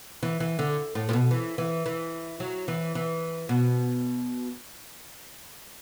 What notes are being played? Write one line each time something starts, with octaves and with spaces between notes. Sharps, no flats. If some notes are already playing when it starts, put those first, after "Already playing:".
E3
E3
D3
A2
A2
B2
E3
E3
E3
F#3
E3
E3
B2